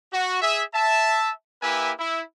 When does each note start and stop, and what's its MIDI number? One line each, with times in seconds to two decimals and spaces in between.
0.12 0.39 66
0.42 0.63 68
0.42 0.63 76
0.74 1.31 76
0.74 1.31 81
1.62 1.92 58
1.62 1.92 64
1.62 1.92 67
1.62 1.92 71
1.62 1.92 76
1.62 1.92 80
1.99 2.22 64